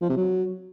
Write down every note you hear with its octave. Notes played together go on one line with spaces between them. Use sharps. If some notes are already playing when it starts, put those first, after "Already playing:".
F3
C3
F#3